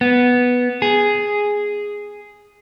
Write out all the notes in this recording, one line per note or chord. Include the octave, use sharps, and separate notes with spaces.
B3
G#4